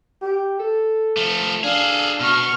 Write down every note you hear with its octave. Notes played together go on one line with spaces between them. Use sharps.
G4
A4
F3 A3
D4 G#4 A4 F5
B2 C#6 F6